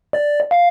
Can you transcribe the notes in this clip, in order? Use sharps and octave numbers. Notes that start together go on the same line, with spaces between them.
D5
F5